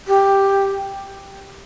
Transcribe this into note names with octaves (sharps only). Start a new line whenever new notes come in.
G4